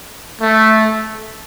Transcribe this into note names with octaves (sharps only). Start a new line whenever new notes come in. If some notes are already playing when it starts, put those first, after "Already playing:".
A3